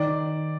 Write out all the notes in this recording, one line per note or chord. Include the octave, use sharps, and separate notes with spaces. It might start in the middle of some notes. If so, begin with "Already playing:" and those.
Already playing: D#3 D5